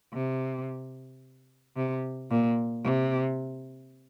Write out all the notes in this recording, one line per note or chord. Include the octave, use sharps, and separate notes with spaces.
C3
C3
A#2
C3